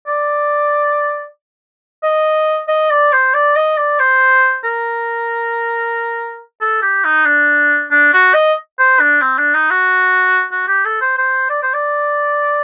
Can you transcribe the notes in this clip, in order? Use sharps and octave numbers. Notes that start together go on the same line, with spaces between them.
D5
D#5
D#5
D5
C5
D5
D#5
D5
C5
A#4
A4
G4
D#4
D4
D4
F#4
D#5
C5
D4
C4
D4
D#4
F#4
F#4
G4
A4
C5
C5
D5
C5
D5